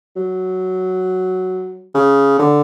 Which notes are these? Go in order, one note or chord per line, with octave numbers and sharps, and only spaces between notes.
F#3
C#3
D3